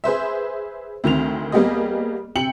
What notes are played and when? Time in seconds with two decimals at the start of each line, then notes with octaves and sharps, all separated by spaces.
0.04 G#4 B4 C5 E5
1.04 D2 D#3 C4 F7
1.52 G3 A#3 B3 G4 G#4 D#5
2.35 C3 G5 C#7 F#7